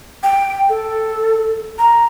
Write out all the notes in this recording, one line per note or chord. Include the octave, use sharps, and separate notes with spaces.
G5
A4
A#5